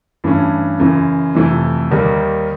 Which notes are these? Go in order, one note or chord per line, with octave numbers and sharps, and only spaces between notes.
G2 E3 A3 C#4
F#2 C#3 E3
F2 C3 E3 A3
D#2 D#3 G3 A#3